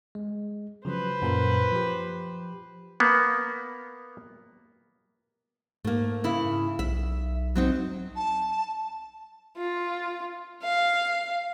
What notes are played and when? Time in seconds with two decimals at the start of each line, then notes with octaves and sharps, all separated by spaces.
0.15 G#3
0.85 C#3 F3 F#3 B4 C5
1.22 F#2 A#2 A#4
1.72 F3 G4
3.00 A#3 B3
5.84 G#2 A3 A#3
6.24 C#3 E4
6.79 B1 E5
7.55 F#3 C4 D#4
8.15 A5
9.58 F4
10.63 F5